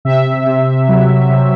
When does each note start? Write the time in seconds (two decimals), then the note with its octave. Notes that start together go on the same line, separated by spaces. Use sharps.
0.05 C3 E5
0.46 C3
0.88 F#3
1.30 C3